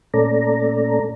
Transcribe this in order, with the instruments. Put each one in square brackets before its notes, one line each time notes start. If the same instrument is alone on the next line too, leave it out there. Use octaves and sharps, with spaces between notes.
[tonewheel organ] A#2 A3 C#4 A4 D5 A#5